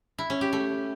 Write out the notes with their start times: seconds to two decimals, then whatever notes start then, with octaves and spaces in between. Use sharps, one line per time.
0.18 E4
0.30 C#4
0.41 G4
0.53 A3